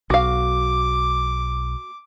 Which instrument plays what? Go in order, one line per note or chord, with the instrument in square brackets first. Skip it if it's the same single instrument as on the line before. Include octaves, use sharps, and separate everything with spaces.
[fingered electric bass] B1 [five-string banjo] F#4 F5 [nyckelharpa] D6